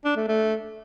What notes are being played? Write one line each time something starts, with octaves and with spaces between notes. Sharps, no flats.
D4
A3
A3